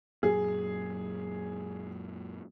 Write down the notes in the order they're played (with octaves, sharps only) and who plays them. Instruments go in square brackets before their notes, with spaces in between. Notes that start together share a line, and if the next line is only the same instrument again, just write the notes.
[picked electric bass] F#2 A#2 F#3 [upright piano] G#4